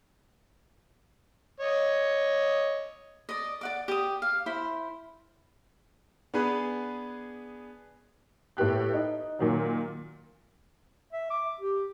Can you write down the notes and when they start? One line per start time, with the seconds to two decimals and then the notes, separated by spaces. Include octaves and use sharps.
1.60 C#5 D#5
3.29 D5 D#5
3.61 D5 F#5 D6
3.88 G4 D#6
4.22 F5
4.46 E4 C5 B5
6.34 B3 D4 G#4 B4
8.57 A2 B3 G4 F#6
8.94 D#4
9.39 A#2 D#3 F#3
11.13 E5
11.30 D6
11.61 G4